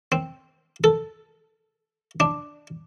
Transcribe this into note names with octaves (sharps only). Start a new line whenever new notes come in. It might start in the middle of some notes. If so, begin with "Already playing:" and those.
C4
A4
D4